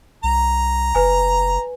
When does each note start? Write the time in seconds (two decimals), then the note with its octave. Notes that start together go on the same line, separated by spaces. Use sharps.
0.24 C2 A#5
0.95 F#1 B4 G#5